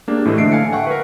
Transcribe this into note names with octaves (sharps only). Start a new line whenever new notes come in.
A#3 D4 G4 G#4
A2 E3 A3 D#5
D3 E5 C7 D7
F5 G#5 A5 C#7
E5 F#5 G5 C#6
A#4 B4